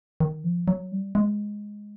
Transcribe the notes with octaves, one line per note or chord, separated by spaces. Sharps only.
D#3
F3
F#3
G3
G#3